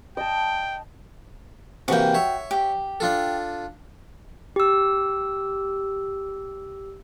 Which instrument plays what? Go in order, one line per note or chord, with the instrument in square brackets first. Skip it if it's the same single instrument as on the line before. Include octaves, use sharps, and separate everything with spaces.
[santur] D#5 A5 [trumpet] G5
[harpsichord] C3 E3 A#3 [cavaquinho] F#4 G5
[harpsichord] C#5 E5
[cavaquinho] G4
[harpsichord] D4 F4 A4
[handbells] G4 E6